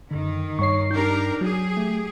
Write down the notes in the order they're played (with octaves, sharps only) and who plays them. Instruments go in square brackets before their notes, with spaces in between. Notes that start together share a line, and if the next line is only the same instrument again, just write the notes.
[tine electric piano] F#2 D3 [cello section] D#3
[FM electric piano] G2 C7 [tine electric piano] C#5 C#6
[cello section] D4 G4 A#4 [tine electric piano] D#4 G6
[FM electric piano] F#3 [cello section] G4 G#4
[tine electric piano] A3